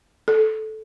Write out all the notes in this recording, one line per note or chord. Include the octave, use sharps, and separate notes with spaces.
A4